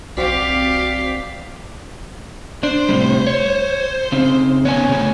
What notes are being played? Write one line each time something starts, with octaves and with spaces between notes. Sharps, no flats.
B1 C4 F#4 G4 D5 F5 B6
D4 C5
A2 C3 G3
C#5
C#3 C4 D#4
B3 C#4 C#5 G#5
C#3 A3